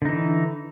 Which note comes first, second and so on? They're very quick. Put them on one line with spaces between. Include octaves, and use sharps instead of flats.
D3 D#4 E3